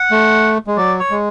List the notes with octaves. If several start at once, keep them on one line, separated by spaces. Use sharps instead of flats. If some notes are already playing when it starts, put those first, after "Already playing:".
Already playing: F#5
A3
G#3
F#3 D5
C#5
G#3